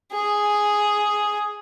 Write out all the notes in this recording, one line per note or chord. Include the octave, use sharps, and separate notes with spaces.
G#4